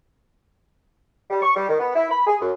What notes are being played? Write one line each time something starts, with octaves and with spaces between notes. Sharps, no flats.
G3
C#6
G3
D#3
B3
E4
B5
G#4
F#2